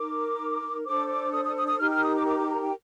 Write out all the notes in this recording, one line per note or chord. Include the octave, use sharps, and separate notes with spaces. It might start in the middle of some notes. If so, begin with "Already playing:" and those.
Already playing: D#4 A#4 D6
D4 A4 C5 D6
D6
D#6
D#6
D#6
D#6
D#4 G4 A#4 F6
F6
D#6
D6
D6
D6
A#5
G5